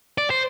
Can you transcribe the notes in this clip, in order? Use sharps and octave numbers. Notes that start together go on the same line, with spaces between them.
D5
C5